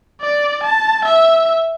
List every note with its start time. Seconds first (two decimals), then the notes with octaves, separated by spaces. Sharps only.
0.21 D5
0.64 A5
1.05 E5